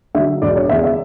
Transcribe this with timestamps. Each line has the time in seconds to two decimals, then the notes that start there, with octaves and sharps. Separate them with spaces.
0.15 D3 F#3 E5
0.42 E1 D5
0.56 C#5
0.69 E2 C#3 E5
0.84 E5